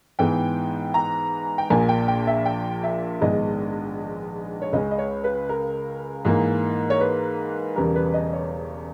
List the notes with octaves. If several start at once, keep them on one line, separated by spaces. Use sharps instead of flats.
G#2 E3 G#3 B3 G5
A#5
G5
A#1 A#2 A#3 G#5
G5
G5
E5
G5
E5
A#1 G#2 D#3 G#3 B3 D#5
C#5
C#2 C#3 G#3 C#4 D#5
D#5
C#5
B4
A#4
G#2 E3 A#3
C#5
B4
E1 E2 C#3 G3 A#4
B4
D#5
C#5